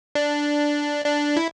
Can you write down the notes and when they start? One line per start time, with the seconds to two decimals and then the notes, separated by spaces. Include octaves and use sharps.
0.15 D4
1.06 D4
1.37 E4